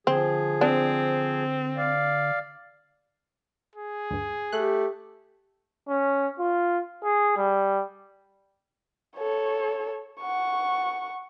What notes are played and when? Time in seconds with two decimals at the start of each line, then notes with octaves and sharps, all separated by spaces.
0.07 D3 F3 C4 G#4
0.61 C4 D4
1.77 D5 F5
3.75 G#4
4.11 D2 G2
4.52 A3 G4 F#6
5.89 C#4
6.40 F4
7.04 G#4
7.37 G3
9.17 A4 C#5
10.21 F#5 C#6